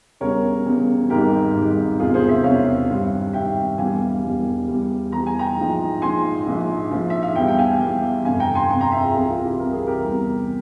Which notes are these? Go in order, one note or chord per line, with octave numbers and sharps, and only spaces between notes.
E1 E2 C#3 G3 A#4 C#5
E1 E2 C#3 G3
G#1 G#2 G3 G4 A#4
G#1 G#2 G3
E1 E2 C3 F4 G#4
G#4 C5
C5 E5
E1 E2 C3 C#5 F5
G#1 G2 G3
G#1 G2 G3 E5 G5
E1 E2 E3 G3 F5 G#5
E1 E2 E3 G3
E2 E3 G3
E2 E3 G3 A#5
G#5
G5 A#5
A#1 G#2 F3
A#1 G#2 F3 G#5 C6
A#1 G#2 F3
A#1 G#2 F3
E5
F5
E2 E3 G3 E5 G5
G5
F5 G#5
E2 E3 G3
G1 F2 C3 F5 G#5
G5 A#5
G#5 C6
G1 F2 C3 G#5 C6
G5 A#5
E5 G5
F4 G#4
C2 C3 E3 F4 G#4
F4
E4 G4
C2 C3 E3 A#4
G#4
G4 A#4
E2 C3 G3